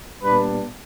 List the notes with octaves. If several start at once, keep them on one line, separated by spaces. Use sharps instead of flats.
A#2 G3 B3 D4 B4